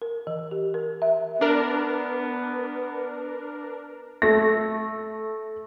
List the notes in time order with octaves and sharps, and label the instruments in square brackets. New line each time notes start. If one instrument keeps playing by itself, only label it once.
[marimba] A#4
E3
G4
A#4
E5
[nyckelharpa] B3 [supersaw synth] D4 A#4 [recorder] B4
[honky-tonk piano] A3 A#6